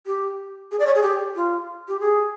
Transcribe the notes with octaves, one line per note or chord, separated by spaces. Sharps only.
G4
G#4
D5
C#5
G#4
G4
F4
G4
G#4